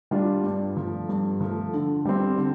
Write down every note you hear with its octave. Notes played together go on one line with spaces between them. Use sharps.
G3 D4 F4
G2
F3 A3
G2
F3 A3
D3
G3 C4
D3